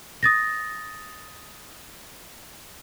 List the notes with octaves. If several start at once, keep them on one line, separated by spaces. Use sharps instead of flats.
D#6 A6 A#6